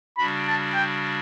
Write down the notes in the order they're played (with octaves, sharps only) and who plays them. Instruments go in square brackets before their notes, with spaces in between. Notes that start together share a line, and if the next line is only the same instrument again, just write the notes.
[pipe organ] C#3 G3 D4 F#4 [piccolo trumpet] B5
[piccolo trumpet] A5
G5